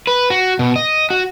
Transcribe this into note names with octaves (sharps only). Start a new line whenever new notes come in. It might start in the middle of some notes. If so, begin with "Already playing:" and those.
B4
F#4
B2
D#5
F#4